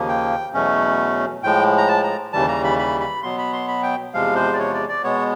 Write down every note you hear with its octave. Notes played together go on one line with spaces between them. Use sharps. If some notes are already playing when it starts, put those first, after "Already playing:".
Already playing: D#2 C#3 F3 A#3
G5
E2 B2 F#3 A3 C#4
A2 F3 G#3 G5
A#5
A5
A#5
D#2 C#3 E3 G3 A5
A#5
B5
B5
B5
B2 F#3 B3 C6
B5
C6
B5
G5
E2 C3 F3 G#3 F5
C5
D5
C#5
D5
D5
B2 G#3 B3 C#5